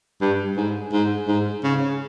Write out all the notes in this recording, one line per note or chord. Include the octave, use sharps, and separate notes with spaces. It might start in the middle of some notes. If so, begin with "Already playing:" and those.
G2
G#2
G#2
G#2
C#3